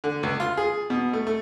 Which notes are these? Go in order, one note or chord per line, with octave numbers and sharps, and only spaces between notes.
D3
C#2
F4
G#4
B2
A3
A3